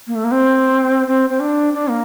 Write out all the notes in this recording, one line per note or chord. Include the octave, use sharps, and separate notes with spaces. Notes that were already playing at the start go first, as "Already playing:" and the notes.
A#3
A3
A#3
C4
C4
C4
D4
D4
A#3